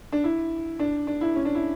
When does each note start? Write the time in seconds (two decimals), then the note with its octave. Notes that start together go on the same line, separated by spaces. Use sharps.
0.12 D4
0.24 E4
0.79 D4
1.07 D4
1.21 E4
1.35 C#4
1.45 D4
1.55 E4